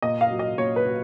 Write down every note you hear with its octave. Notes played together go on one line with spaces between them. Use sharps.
A#2 D#5
F5
F#3
D#5
A#2 C#5
B4
F#3